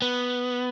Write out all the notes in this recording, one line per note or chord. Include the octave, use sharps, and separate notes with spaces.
B3